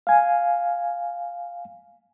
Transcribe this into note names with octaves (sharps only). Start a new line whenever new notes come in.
F5 G#5